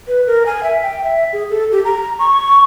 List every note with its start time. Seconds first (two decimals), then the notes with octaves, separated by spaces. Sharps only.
0.08 B4
0.27 A#4
0.46 G#5
0.63 E5
0.83 G5
1.04 E5
1.33 G#4
1.50 A4
1.72 G4
1.85 A#5
2.19 C#6